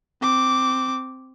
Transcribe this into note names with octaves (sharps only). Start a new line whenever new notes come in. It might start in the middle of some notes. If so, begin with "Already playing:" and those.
C4 D6